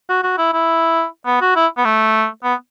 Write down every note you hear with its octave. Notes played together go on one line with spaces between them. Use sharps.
F#4
F#4
E4
E4
B3
F#4
E4
B3
A3
B3